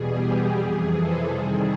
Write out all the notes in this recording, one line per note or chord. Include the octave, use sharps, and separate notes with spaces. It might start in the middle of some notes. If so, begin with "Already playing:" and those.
Already playing: E2 B2 G3 G#4
G4
F2 C3 E3 G#4
A4
C3 D#3 G3 G#4